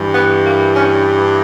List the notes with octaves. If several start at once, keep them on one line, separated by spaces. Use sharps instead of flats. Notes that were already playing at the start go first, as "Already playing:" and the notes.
Already playing: G2 E3
B3
A#3
C#4